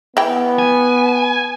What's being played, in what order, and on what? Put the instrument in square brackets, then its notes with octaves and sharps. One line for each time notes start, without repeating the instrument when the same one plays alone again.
[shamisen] E3 G5 [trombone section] B3
[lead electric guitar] G#5